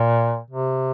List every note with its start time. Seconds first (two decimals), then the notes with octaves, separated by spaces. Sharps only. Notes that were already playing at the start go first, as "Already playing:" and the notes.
Already playing: A#2
0.50 C3